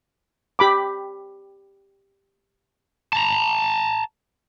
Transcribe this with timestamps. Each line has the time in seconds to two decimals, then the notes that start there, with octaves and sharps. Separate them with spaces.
0.59 G4 B5 D6
3.13 A5 A#5